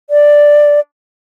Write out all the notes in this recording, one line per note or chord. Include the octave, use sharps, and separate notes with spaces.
D5